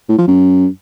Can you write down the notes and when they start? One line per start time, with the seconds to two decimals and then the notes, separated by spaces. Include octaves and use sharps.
0.09 A2
0.18 F3
0.28 F#2